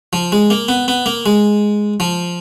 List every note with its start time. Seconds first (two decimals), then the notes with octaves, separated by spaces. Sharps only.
0.13 F3
0.32 G#3
0.50 A#3
0.68 B3
0.88 B3
1.06 A#3
1.26 G#3
2.00 F3